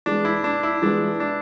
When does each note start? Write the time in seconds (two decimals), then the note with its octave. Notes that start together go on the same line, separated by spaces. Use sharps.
0.06 E3 G#3 B3 D4
0.25 E4
0.44 D4
0.63 E4
0.82 E3 G#3 B3 D4
1.20 D4